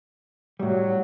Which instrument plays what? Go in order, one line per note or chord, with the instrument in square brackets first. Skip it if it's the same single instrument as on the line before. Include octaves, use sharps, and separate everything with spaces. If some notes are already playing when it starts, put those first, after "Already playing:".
[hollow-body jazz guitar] A2 G3 [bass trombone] F#3